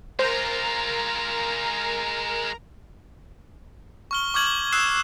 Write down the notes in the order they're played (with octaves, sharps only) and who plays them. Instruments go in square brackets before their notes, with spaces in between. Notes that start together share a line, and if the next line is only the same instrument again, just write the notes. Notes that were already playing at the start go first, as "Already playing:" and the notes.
[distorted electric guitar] G#3 F4 [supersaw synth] A#4 A#5 [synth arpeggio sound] C5
[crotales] C#6 F6 G7
C#6 D6 F6 G6 G#6 F#7
D#6 E6 F#6 C7 E7